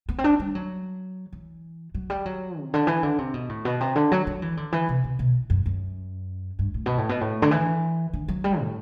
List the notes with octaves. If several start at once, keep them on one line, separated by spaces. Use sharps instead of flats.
B3
C4
D4
G3
F#3
E3
F#3
G3
F#3
C3
D3
E3
D3
C3
B2
A2
B2
C3
D3
F#3
F#3
E3
D3
E3
C3
C3
B2
F#2
F#2
G2
A2
B2
A2
B2
A2
D3
E3
D3
F#3
G3
A2